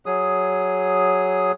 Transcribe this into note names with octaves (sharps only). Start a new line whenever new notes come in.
F#3 G#4 D#6